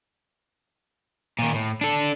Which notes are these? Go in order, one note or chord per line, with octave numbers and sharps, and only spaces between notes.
A#2 D#3
A2
D4 A4